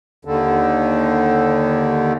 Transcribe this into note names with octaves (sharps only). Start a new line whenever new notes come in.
D#2 D3